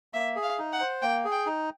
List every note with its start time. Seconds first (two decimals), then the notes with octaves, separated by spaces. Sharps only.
0.14 A#3 E5
0.36 G#4
0.43 F5
0.59 D#4
0.73 F#5
0.80 C5
1.02 A#3 G5
1.25 G#4
1.32 G5
1.46 D#4